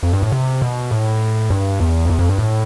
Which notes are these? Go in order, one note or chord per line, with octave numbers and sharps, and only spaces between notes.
F2
G2
A2
C3
B2
A2
G2
E2
F2
E2
F2
G2
A2